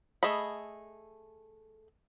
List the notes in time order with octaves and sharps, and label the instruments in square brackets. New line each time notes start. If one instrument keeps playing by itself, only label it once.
[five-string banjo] A3 G#4 D#5 B5